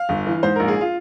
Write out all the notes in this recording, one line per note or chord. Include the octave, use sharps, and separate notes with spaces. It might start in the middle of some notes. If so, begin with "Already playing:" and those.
Already playing: F5
G1
E3
G#2 C5
A#1 A#4
G#4
F4